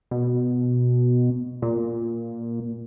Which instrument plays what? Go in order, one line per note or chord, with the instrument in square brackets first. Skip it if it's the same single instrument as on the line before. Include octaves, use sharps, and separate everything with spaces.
[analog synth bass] B2
A#2